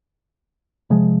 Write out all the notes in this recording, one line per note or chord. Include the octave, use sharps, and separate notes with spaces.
C3 F3 G#3